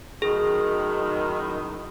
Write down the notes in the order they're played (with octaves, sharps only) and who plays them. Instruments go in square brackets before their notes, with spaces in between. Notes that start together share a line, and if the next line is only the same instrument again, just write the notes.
[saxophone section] F#2 A2 D#3 [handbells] G#4